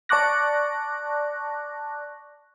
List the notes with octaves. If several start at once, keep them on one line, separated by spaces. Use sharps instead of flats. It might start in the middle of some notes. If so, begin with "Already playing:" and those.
D5 A5 C#6 D6 F#6 A#6